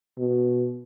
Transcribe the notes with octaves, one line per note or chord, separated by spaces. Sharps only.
B2